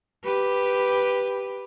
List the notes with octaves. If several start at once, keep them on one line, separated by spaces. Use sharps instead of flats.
G4 B4